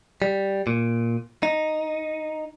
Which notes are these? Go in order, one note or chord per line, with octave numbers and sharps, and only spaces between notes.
G3
A#2
D#4